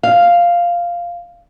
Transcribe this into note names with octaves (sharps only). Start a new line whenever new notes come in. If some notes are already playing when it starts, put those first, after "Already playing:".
F5